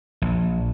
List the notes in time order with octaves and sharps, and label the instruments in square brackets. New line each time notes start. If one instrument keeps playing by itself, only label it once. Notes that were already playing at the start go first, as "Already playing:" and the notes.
[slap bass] A#1